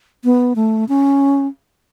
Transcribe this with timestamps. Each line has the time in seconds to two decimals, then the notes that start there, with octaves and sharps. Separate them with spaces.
0.24 B3
0.56 A3
0.89 C#4